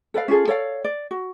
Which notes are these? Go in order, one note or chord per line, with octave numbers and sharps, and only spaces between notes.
A4 B4 D5 F5
C#4 F4 G#4 A4
A4 C#5 D5 F5
D5
F#4